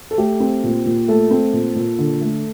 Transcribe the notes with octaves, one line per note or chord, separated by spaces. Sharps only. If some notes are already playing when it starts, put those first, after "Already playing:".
A4
A3 G4
C4
A#2
A#2
A3 A4
C4
A#2
A#2
D3
A3